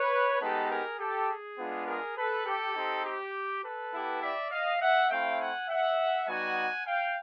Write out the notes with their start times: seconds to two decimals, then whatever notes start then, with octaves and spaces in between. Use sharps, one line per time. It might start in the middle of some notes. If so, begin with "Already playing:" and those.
Already playing: B4 C#5
0.41 G#3 B3 D#4 G4 A4 B4
0.70 G#4 A#4
1.00 G4 A4
1.29 G#4
1.58 G#3 B3 D4 F4
1.88 G#4 A#4
2.17 A4 B4
2.46 G4 A4
2.76 C4 D#4 G4
3.06 G4
3.63 A4 B4
3.93 B3 E4 G4
4.22 D5 E5
4.51 D#5 F5
4.81 E5 F#5
5.10 A3 C4 E4 F5 G5
5.40 F#5 G#5
5.69 E5 F#5
6.28 G3 B3 D#4 F#4 F#5 G#5
6.86 F5 G5